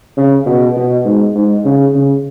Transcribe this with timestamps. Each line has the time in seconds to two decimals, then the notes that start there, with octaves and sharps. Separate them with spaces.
0.17 C#3
0.46 B2
0.76 B2
1.05 G#2
1.35 G#2
1.64 C#3
1.94 C#3